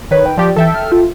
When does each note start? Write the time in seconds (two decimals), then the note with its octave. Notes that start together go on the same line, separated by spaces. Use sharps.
0.11 D#3 B4 C#5
0.26 G5
0.38 F3 G4 D5
0.56 E3 A4 E5 G5
0.74 F6
0.92 F4